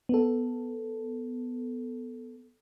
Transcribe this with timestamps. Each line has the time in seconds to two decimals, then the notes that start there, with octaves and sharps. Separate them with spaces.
0.09 B3 A4